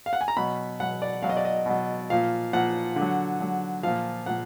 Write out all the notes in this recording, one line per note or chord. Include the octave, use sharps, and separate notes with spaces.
F5
F#5
G#5
A#5
B2 F#3 B5
B2 F#3 F#5
D5
B2 F#3 F5
D#5
D5
D#5
B2 F#3
A#2 F3 F5
A#2 F3 F#5
D3
F#3
D3 F#3
A#2 F3 F5
A#2 F3 F#5